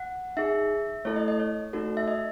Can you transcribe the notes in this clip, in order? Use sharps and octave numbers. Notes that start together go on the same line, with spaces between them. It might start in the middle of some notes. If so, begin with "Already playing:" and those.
Already playing: F#5
D#4 G#4 E5
A3 E4 A4 C#5
D#5
D#5
C#5
A3 D#4 F#4 A4
E5
D#5